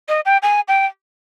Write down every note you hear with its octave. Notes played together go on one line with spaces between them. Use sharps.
D#5
G5
G#5
G5